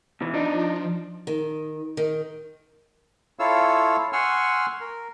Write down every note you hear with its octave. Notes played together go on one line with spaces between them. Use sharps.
B2 E3
F3 D4 D#4
D#3
D#3
E4 F4 A4 C#5 F5 E6
F#5 G#5 C6 C#6 E6 F6
A#4